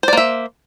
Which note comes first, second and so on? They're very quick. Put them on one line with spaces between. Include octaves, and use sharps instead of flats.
C5 D5 A#3 E5